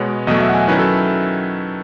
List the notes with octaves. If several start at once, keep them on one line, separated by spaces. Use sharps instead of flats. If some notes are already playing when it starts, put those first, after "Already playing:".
Already playing: B2 G#3 B3 C#5
E2 B2 F#3 A3 D#5
E5
F#5
G#5
D#3 F#3 C#4 E4 B4
A4